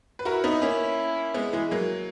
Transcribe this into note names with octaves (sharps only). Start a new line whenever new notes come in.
B4
E4 F#4 A#4
B3 D#4
A#3 C#4
G#3 B3
E3 G#3
F#3 A#3